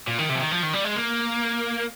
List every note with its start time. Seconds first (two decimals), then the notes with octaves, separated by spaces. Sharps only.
0.07 A#2
0.18 D#3
0.29 C3
0.35 F3
0.41 D#3
0.51 F3
0.63 D#3
0.73 G3
0.85 G#3
0.96 A#3